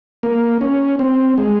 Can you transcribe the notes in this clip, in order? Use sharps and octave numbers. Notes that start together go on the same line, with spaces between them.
A#3
C#4
C4
G#3